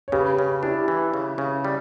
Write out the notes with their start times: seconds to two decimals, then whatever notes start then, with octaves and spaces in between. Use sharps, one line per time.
0.08 C#5
0.12 C#3 G4 B4
0.38 C#3
0.63 D4 E4 G4
0.88 E3
1.14 C#3
1.38 C#3
1.65 G3